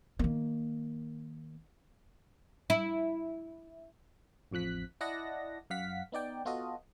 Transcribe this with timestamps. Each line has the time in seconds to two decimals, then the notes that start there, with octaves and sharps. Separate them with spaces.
0.19 D#3 A#3
2.70 E4
4.51 A1 F2 F3 F#6 B6
5.01 E4 D5 D#5 F#5 A5 A#6
5.70 F#2 F5 F#5 B6
6.12 B3 D#4 D5 G5
6.45 B3 F4 F#4 A4 D#5